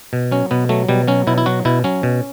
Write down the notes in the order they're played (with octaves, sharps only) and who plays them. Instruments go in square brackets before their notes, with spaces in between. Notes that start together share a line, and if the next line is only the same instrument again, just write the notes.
[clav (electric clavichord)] B2
F#3 C#4
B2 B3
F#3 A3
B2 G3
F#3 C#4
B2 E4
E4
F#3 F#4
B2 E4
F#3 C#4
B2